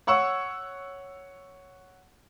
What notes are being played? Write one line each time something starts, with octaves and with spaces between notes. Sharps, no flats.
C#5 F#5 C#6 E6